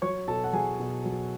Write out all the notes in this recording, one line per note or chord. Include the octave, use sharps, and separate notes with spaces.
F#3 C#5 C#6
B2 A4 A5
F#5
F#3 G#4 G#5
B2
F#3